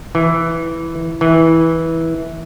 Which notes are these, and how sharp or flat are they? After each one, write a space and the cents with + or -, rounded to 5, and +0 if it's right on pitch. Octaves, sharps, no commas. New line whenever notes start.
E3 +0
E3 -15